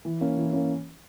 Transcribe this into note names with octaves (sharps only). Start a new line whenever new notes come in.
E3
A#3 C#4
E3
A#3 C#4